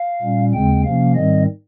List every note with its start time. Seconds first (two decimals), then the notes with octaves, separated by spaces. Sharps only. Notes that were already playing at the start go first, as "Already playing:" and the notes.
Already playing: F5
0.22 A#2 G3 C#4
0.54 D#2 C#3 G#3 C4 G5
0.84 C3 F3 A#3 C#4 F5
1.15 G#2 D#3 G3 C4 D#5